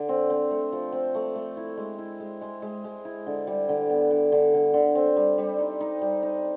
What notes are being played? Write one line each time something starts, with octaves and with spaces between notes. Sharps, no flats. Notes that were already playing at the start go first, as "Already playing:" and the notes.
Already playing: D3
C4
C4
A3
F3
C4
A3
A3
E4
G#3
E4
G#3
G#3
G#3
G#3
E4
D3
G3
D3
B3
D3
D3
D3
D3
C4
G3
G3
D#4
D#4
G3
D#4